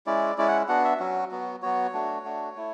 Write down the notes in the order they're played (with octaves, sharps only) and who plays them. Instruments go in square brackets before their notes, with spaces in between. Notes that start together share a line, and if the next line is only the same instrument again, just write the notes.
[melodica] G#3 C#4 E4 D5
G#3 C#4 E4 D5
F#5
B3 D4 F#4 F#5
E5
F#3 C#4 F#4
F#3 B3 F#4
F#3 B3 F#4 C#5
A3 D4 F#4
A3 D4 F#4
A3 E4